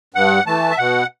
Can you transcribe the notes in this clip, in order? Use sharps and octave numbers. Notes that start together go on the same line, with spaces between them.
G2 F#5
E3 A3 A5
E5
B2 F#5